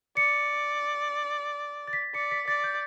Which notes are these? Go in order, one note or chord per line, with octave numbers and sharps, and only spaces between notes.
D5 C#7
A6
B6
D5 C#7
B6
D5 A6
G6